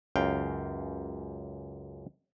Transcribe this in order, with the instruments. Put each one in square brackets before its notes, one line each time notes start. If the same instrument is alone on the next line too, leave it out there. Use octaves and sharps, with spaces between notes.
[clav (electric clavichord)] C#2 F#2 F5 G5